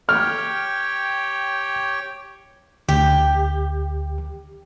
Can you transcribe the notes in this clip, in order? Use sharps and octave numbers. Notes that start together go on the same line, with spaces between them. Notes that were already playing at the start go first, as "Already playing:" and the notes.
G4 C#5 G5 F6
D2 G4